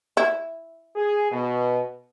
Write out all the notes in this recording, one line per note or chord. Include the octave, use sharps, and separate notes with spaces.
E4
G#4
B2